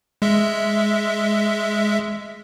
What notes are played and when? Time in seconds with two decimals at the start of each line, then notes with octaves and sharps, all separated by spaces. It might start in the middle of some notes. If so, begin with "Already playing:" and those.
0.22 G#3 E5